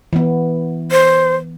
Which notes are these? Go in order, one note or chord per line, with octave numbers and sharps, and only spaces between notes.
E3 B3
C5